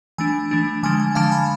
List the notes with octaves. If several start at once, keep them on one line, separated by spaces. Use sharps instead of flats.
E3 A3 D4 G#5
E3 A3 D4
D3 F3 G#3 D4 G#5
G#5
D3 F3 G#3 D4 F5 A5
G#5 B5